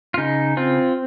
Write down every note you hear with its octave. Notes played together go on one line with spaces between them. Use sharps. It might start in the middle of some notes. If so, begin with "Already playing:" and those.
F4
C#3 D#4
C4 F4